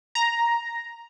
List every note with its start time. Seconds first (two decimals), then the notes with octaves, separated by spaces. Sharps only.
0.15 A#5